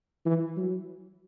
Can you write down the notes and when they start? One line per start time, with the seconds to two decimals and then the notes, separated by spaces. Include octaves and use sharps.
0.26 E3
0.57 F#3